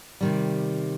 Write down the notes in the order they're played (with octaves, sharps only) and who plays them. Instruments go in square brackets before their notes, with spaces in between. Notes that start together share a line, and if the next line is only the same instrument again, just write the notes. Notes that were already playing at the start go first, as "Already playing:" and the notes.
[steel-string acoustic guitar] C3 D#3 G3